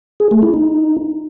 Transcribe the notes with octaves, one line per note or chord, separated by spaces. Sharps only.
G#4
A3
E4
D#4